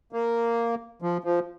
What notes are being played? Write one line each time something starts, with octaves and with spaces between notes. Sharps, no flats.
A#3
F3
F3